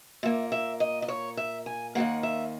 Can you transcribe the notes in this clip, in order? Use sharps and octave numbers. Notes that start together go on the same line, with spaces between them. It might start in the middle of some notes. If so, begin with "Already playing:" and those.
A#2 A#3 E5
E5
D#5
D#5
C#5
E5
G#5
D#2 D#3 F#3 A#3 F#5
E5